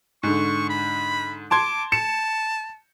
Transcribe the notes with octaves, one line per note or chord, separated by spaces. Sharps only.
G#2 D3 C#6
B5
A5 C6 D6 G#6
A5 C#7 E7